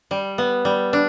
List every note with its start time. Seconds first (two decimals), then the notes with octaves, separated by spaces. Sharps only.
0.11 G3
0.38 B3
0.65 G3
0.93 D4